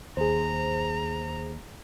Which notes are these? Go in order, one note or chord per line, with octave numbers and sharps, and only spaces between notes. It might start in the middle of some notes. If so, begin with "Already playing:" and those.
D#2 G#4 C5 A#5